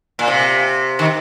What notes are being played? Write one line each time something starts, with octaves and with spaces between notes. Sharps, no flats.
A#2
C3
D#3